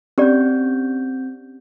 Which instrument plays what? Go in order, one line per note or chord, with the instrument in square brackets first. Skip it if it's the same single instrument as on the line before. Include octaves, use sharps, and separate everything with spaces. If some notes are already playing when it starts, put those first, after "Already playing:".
[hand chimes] C4 G6 [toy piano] C#4 G4 D5